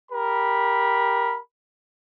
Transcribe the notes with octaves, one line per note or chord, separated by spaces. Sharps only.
G4 A#4 B5